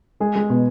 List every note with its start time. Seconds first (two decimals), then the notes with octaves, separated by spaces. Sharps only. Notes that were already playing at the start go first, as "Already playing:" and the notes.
0.20 G#3 G#4
0.36 G#3
0.50 B2